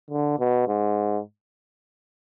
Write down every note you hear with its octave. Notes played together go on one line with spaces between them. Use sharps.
D3
B2
G#2